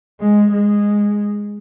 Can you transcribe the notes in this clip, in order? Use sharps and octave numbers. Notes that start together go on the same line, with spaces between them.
G#3
G#3